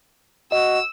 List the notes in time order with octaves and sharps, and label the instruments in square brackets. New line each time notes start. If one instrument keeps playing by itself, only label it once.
[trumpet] F#4 [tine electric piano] D#5 [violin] E6